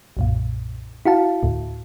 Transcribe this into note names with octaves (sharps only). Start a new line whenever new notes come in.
B1 F#2 A#2
E4 F#4 F5 A5
D2 A2